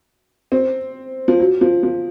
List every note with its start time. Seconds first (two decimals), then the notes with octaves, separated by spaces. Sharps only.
0.52 C4
1.28 F3
1.40 F#3
1.61 F3
1.83 F3